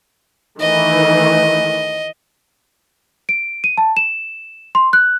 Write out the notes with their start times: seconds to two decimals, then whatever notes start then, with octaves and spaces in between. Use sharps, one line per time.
0.60 D#3 E3 A3 D#5
3.29 D7
3.64 D#7
3.78 A5
3.97 E7
4.75 C6
4.93 F#6